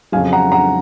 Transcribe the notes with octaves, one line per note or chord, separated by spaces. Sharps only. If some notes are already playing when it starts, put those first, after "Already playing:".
F2 C#3 F#3 F5 G#5
F#5 A#5
F#5 A#5